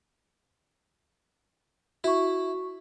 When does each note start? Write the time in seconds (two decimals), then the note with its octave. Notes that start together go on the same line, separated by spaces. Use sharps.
2.04 E4 F#4 C#6